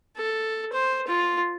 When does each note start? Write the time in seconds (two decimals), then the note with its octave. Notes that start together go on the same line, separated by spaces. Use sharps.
0.17 A4
0.73 C5
1.07 F4